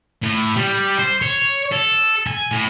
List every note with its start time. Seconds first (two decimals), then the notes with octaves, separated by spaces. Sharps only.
0.23 A2
0.56 G3
0.99 C5
1.22 C#5
1.72 A4
2.27 G#5
2.52 A2